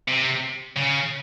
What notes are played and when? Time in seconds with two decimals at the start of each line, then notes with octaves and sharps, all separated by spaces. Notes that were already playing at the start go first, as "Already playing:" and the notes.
0.08 C3
0.77 C#3